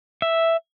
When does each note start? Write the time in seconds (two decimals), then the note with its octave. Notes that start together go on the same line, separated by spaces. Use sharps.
0.22 E5